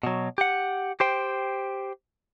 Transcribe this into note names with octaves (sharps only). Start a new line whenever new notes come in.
B2 F#3
G4 F#5
G4 C5 G5